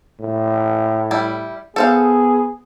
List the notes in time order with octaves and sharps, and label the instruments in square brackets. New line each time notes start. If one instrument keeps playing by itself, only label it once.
[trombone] A2
[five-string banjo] G3 E4
[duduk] B3 [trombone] G#4 [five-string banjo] A4 C5 F5